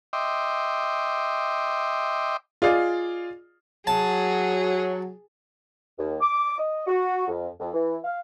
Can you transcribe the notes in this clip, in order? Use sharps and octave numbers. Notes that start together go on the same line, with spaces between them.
D#5 E5 G5 C6 D6
F4 G#4 D5 D#5 F5
F#3 G#4 A5
D#2
D6
D#5
F#4
F2
F2
E3
F5